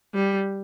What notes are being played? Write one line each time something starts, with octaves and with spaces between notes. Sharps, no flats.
G3